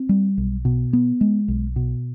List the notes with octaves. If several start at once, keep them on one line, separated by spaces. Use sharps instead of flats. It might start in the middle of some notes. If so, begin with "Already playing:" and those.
Already playing: C4
G3
B1
B2
B3
G#3
B1
B2